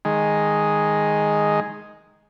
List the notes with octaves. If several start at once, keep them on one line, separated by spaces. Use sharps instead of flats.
D#3 G#3